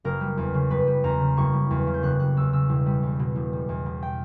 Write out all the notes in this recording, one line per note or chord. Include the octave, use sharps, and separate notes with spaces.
F#1 A#4
G3
E2
C#3
F#1 B4
G3
E2 A#5
C#3
F#1 C#6
G3
E2
C#3
G6
F#1 F#6
G3 F#6
E2 E6
C#3 E6
E1
G3
E2
B2
E1
G3
E2
B2
G5